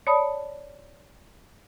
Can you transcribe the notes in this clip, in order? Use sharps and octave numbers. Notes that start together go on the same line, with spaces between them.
C#5 D5 A5 B5 D#6